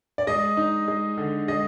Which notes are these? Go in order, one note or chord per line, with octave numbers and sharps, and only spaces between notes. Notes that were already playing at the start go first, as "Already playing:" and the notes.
D5
G#3 D#5
D#4
G#3
D3
G#3 D#5